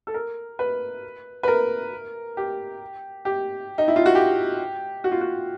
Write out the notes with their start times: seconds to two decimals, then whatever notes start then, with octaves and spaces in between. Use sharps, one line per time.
0.07 A4
0.14 A#4
0.59 B4
1.43 B4
1.48 A#4
2.37 G4
3.25 G4
3.78 D#4
3.88 E4
3.96 F4
4.06 F#4
4.15 G4
5.04 F#4
5.12 F4
5.21 F#4